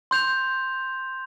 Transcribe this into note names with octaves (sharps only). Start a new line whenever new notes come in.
C6 G6 F7